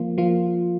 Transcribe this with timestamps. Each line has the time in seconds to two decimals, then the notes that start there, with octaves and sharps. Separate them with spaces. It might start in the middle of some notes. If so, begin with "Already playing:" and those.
Already playing: F3 A#3 F4
0.18 F3 A#3 F4